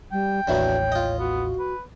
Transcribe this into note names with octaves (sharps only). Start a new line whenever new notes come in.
G3 G5
A1 D#2 A2 D3 E3 F#3 C#5
F4 D#5
B3 F#4
B4